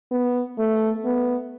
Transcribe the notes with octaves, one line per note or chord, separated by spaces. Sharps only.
B3
A3
B3